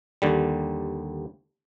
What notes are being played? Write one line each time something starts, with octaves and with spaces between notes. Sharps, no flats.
D#2 D3 G3